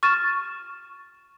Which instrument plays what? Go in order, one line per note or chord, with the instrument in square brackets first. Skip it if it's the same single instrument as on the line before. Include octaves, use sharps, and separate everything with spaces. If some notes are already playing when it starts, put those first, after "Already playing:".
[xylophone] C#6 F6 A6 D#7 E7